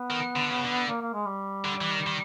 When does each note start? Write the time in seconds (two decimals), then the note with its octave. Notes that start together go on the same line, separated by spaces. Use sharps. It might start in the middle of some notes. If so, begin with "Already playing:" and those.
Already playing: B3
0.11 D#3
0.36 D3
0.51 C#3
0.64 D3
0.88 A#3
1.01 A#3
1.14 G#3
1.27 G3
1.65 D3
1.81 E3
1.91 D#3
2.07 D#3